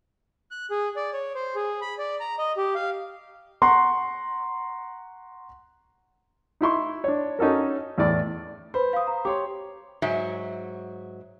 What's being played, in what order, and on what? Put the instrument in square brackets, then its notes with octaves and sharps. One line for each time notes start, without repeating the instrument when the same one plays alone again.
[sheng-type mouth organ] F#6
G#4
D5
C#5
C5
G#4
B5
D5
A#5
D#5
G4
F5
[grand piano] F#5 A#5 C6 C#6
[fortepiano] D#4 E4 C6 C#6
D4 C#5
C#4 D#4 F#4 A4 A#4
E2 A2 D5
[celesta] B4 [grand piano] C5 B5
[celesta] F5 D#6
A#5
[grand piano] G4 C#5 C6 [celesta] D6
[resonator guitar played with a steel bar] G#2 F#3 E5